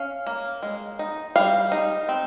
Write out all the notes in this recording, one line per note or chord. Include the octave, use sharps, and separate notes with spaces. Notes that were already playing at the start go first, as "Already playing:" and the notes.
Already playing: C#4 F5
A#3
G#3
D#4
G3 F5
D#4
C4